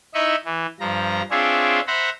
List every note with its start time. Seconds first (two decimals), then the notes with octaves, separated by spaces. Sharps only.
0.14 D#4 E4 D#5 E5 B5 C#6
0.45 E3
0.80 G2 F3 A#5
1.31 C4 D4 F4 G#4 C#5 E5
1.87 C5 E5 F#5 A#5 B5